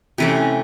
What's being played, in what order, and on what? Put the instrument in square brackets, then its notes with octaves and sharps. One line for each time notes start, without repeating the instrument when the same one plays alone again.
[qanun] C3 E3 A3 C#4